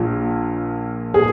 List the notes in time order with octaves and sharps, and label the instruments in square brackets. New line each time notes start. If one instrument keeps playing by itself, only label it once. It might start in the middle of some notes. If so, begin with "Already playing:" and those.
Already playing: [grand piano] A#1 A#2
G#4